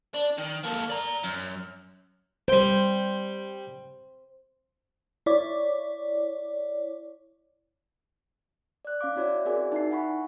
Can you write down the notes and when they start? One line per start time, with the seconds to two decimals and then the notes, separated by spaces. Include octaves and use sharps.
0.14 D4
0.38 D#3
0.64 A#3 A4
0.90 D5 A#5
1.24 F#2
2.48 G3 C5 G5
5.26 E4 C#5 D5
8.85 D5 F#6
9.01 C#4 F5 D6
9.16 C#4 E4 F#4 C#5 D5 E5
9.45 C4 F#4 G#4 A#4 D5 G#5
9.72 D#4 E4 E5 C7
9.91 F#5 G#5 B5 C#6